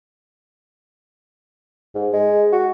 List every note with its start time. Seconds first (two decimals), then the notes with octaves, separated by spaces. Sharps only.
1.95 G#2
2.13 G#3
2.52 F#4